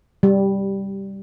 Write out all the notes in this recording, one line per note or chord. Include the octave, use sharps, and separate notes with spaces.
G3